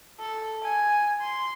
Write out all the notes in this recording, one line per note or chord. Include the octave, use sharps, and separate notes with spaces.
A4
G#5
C6